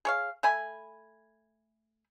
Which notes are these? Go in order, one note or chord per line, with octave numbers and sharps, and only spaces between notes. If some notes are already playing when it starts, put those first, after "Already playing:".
G#4 C#5 F5
A3 G#5 B5